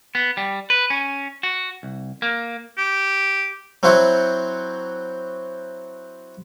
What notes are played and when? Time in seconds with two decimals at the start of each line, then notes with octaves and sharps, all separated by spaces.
0.15 B3
0.37 G3
0.70 B4
0.90 C#4
1.43 F#4
1.83 C2
2.22 A#3
2.78 G4
3.83 F#3 C4 E4 F#4 C5